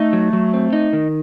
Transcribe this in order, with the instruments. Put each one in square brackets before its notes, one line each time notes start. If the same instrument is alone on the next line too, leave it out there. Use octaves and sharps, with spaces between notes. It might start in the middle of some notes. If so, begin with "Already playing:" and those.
Already playing: [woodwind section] A3 [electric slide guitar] D#4
[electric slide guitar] F#3
F#3
C4
D#4
D#3